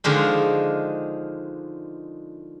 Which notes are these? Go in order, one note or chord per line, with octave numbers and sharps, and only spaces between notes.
D3 D#3 F3 G#3